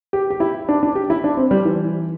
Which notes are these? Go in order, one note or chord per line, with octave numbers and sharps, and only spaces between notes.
G4
G4
E4
D4
D4
G4
E4
D4
C4
G3
E3